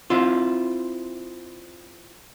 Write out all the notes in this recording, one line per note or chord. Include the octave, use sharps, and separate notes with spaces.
C4 E4 F4